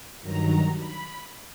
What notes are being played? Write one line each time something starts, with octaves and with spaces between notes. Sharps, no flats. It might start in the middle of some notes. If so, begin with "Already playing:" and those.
G2 D#3 F#3 A#5
B5